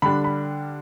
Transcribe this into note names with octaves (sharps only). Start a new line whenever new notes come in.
D3 G3 D4 B5
B5